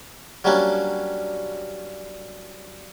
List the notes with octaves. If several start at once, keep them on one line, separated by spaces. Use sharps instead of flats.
F#3 G3 A#3 C#4 D4